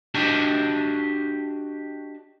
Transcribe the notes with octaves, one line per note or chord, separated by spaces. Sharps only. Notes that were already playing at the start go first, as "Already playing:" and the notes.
D4 F#4 G4 D#5 A5